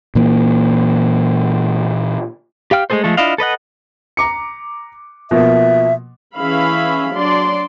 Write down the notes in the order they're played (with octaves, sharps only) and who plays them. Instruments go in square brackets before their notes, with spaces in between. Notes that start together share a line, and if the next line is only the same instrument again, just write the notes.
[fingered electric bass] A#2 E3 A#3
[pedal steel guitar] G4 F5 G5 F6
G#3 A3 G#4 A4 C5
F3 G#3 A3 A4
D4 E4 F4 D#5 F5
A4 B4 D#5 F#5
[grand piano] A#5 D6 C#7
[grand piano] B2 F3 A#3 [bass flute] E5
[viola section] E3 C#4 G#4 E5 F5 B5
F#3 D4 D5 C6